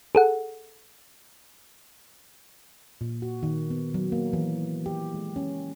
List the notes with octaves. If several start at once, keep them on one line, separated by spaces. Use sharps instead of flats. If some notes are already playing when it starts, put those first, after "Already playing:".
G#4 A4 F#5
A#2
F#4
D#3
B3
F#3
A#3
E3
G4
G#3
C#4